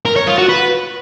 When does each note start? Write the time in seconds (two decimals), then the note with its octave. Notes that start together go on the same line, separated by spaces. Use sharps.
0.05 A#4
0.16 C#5
0.27 F4
0.38 F#4
0.49 B4